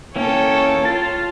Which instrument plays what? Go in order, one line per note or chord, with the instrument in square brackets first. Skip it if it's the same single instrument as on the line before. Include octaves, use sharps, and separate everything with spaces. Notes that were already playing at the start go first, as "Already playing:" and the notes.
[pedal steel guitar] E3 A#3 C#4 [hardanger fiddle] A4 G5 [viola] C#5
[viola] F4 [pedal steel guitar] A5